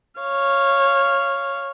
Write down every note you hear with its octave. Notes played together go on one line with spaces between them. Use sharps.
C#5 F5